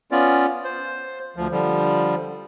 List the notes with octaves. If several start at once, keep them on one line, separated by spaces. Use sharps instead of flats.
B3 C#4 F4 D5
C5
D2 F3
D3 F3 G3